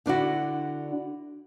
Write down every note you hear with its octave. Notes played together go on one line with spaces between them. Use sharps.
D3 D4 E4 F#4